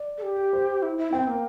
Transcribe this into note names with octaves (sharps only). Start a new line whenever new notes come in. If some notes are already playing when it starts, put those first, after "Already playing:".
Already playing: D5
A4
G4
C5
E4
E4
C4 G5
A#3